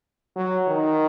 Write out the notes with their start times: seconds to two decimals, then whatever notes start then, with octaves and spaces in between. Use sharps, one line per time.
0.36 F#3
0.68 D#3